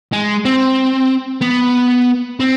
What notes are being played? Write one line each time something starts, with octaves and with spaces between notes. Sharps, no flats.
G#3
C4
B3
C4